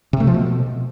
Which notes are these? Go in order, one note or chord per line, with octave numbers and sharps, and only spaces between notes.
C3
A3
F3
B2